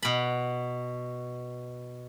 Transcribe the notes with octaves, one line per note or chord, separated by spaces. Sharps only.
B2 B5